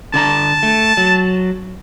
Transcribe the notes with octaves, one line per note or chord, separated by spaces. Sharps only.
D3 D4 A5 A#5
A3
F#3